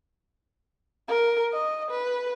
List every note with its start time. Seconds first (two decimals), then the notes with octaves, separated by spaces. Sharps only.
1.08 A#4
1.53 D#5
1.90 B4